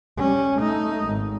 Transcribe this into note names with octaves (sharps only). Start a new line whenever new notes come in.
G3 C#4
A3 D#4
G#1